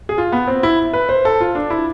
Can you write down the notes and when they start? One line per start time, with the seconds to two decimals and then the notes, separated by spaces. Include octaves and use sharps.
0.09 G#4
0.18 F4
0.32 B3
0.47 C4
0.63 E4
0.93 B4
1.09 C5
1.25 A4
1.40 F4
1.55 D4
1.70 E4